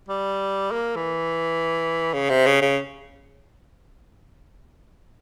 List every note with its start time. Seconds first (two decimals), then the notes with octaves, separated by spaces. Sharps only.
0.09 G3
0.71 A#3
0.96 E3
2.13 C#3
2.29 C3
2.46 C#3
2.62 C#3